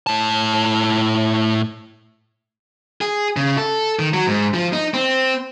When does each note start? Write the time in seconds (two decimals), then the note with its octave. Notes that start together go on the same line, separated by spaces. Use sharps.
0.07 A2 A5
3.01 G#4
3.36 C#3
3.58 A4
3.99 D#3
4.14 F#3
4.27 G#2
4.54 F3
4.73 D#4
4.94 C4